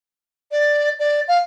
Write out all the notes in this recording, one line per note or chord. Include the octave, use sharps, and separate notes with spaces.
D5
D5
F5